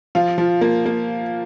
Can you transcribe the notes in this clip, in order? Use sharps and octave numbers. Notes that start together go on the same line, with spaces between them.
F3 F4
F3
A#3
A#3